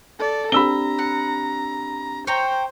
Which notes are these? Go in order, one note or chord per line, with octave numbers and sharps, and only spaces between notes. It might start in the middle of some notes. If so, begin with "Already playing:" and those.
A4 D5
C4 D4 G4 A#5 B5 E6 G7
F#5
C5 C#5 G5 A#5